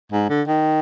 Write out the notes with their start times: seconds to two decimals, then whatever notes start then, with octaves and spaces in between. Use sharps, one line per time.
0.12 G#2
0.29 D3
0.48 D#3